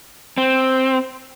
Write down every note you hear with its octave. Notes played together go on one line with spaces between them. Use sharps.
C4